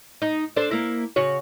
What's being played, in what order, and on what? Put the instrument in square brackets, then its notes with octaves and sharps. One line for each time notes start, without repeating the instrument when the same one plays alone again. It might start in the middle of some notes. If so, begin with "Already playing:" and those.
[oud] D#4
D4 A4 C5
A#3 E4
C#3 F#4 C#5